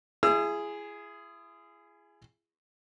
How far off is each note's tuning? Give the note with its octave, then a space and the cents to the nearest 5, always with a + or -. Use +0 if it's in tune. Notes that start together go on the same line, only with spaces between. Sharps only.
E4 +40 G#4 +0 E6 +40